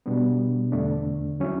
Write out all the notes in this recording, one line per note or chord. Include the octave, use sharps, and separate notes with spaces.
B2 G3 B3 D4
E2 D3 A3 D4
F#3 C#4 E4